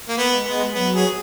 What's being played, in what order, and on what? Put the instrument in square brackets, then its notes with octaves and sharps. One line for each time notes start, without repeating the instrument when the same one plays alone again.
[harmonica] A#3
B3
[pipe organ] G#3
[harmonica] B3
[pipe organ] F#3 [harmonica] B3
[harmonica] G#4